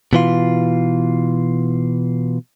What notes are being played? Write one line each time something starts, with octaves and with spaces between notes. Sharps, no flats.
B2 E3 F4